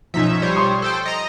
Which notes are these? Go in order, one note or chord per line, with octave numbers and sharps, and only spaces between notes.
B1 F3 C#4 D#4 E5
G3 C5 C#5
C6 D#6
A4 C5 G5
D#5 A#5